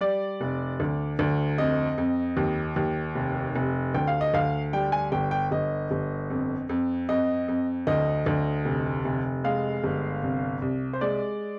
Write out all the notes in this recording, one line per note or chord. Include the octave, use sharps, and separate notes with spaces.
G3 D5
F1
D2
D2
F2 D#5
F2
D#2
D#2
F1
F1
D2 G5
F5
D#5
D2 F5
G3 G5
G#5
G1 G5
G5
G1 D#5
G1
F2
F2
F2 D#5
F2
D2 D#5
D2
F1
F1
G#3 F5
G1
C2
C2
C5
G#3 D5